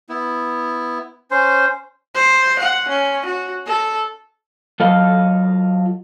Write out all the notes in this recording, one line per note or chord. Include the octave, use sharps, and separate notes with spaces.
B3 E4
C#4 C5
C5
F#5
C#4
F#4
A4
F#3 F4 A4 D#5 F5